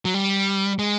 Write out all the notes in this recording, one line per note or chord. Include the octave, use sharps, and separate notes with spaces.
F#3
G3
G#3